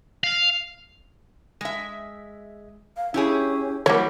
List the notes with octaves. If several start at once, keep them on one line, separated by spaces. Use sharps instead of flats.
F5
G#3 E5
F5
C#4 E4 G4 G#4
E3 F#3 G3 A#3 C#5 F#5